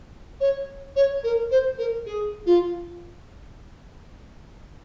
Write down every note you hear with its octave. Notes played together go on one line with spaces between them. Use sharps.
C#5
C#5
A#4
C5
A#4
G#4
F4